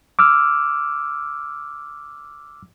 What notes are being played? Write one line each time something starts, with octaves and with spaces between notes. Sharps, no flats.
D6 E6 F6